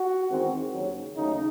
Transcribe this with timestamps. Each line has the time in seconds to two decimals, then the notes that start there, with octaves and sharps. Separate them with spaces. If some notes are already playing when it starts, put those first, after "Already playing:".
Already playing: F#4
0.30 E2 D#3 G#3 C4
0.73 D#2 C#3 F#3
1.16 D#2 C#3 F#3 A3 D#4